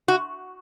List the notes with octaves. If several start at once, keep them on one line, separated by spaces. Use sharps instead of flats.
F#4